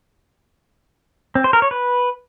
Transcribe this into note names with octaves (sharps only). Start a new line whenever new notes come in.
C4
C5
A#4
C#5
B4